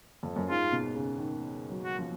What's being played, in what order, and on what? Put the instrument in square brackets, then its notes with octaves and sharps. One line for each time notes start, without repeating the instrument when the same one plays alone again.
[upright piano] F2
F#2
[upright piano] G#2 [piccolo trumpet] F4
[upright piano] B2
C#3
D#3
F#3
[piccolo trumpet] F#4
[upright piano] F3